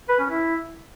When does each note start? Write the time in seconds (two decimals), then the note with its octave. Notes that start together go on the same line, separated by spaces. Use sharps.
0.09 B4
0.20 C#4
0.30 E4